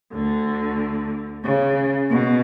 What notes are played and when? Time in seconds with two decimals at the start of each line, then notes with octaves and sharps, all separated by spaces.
0.13 D2 D3
1.44 C#3
2.09 B2